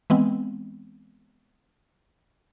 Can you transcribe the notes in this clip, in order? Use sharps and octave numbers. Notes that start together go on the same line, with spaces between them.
E3 G#3 B3 C4